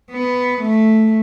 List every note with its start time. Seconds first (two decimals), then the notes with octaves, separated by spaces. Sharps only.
0.11 B3
0.61 A3